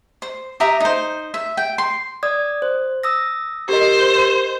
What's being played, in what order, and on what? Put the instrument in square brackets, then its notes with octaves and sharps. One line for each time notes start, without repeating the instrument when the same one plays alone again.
[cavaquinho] C5
G4 E5 A#5 D#6
D#4 C5
E5
G5
C6
[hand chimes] D5 D#6 G#6
C5
D#6 E6 A#6
[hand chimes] G4 A#4 D#5 [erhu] C5